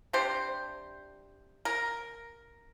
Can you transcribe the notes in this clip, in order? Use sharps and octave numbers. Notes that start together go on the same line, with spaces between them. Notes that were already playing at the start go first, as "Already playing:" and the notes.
C3 G3 D4 C5
A#4